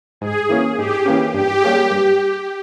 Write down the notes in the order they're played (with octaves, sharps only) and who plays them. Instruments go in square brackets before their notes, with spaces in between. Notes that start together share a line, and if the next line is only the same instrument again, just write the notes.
[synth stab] G#2 [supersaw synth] G#4
[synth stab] E3 A#3 C#4
[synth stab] G#2 [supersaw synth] G4
[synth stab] E3 A#3 C#4
[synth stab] G2 [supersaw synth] G4
[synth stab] G3 A#3 C#4 G#4
G2